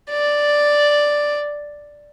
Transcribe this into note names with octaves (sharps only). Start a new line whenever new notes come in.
D5